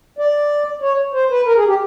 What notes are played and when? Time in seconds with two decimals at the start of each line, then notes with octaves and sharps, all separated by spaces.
0.18 D5
0.82 C#5
1.13 C5
1.30 B4
1.46 A#4
1.56 G#4
1.67 G4